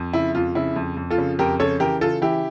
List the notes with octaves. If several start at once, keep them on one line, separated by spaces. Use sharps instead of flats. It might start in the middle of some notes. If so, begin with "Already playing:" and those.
Already playing: F2
C#3 E4
F2 F4
C#3 E4
F2
F2
F4 A4
C#3
F2 G4 A#4
C#3 A4 C#5
E3 G4 A#4
C#3 F4 A4
E3 E4 G4